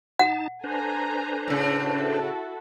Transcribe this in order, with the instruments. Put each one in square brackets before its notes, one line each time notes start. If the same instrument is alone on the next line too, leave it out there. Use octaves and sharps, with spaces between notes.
[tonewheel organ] D#4 A5 [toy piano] F#5
[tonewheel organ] D4 B4 C5 [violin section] A4 G#5 A#5
[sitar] A2 C#3
[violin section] E4 F#4 A4